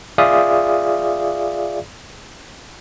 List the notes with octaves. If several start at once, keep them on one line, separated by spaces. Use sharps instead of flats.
F4 G#4 D5 E5 F5 D#6